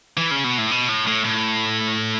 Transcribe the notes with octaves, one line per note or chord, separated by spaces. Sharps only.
E3
C#3
B2
A2
B2
A2
A2
A2